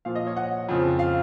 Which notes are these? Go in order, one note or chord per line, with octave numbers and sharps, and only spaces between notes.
A#2 F3 F5
D#5
C#5
F#5
F2 C#3 F3
F5